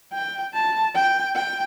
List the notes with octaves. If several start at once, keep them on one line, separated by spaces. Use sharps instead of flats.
G5
A5
G5
G5